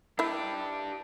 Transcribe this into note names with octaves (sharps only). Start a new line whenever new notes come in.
D4 E4 G4 E5